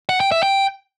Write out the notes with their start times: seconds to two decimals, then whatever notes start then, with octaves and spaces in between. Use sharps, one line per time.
0.09 F#5
0.20 G5
0.32 E5
0.43 G5